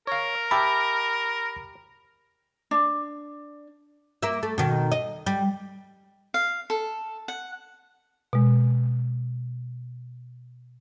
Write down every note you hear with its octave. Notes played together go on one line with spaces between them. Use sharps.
A#4 C#5 F5
G4 E5 A5 B5
D4
A#3 E5
A3
B2 D#3
D#5
G3
F5
A4
F#5
B2 G#3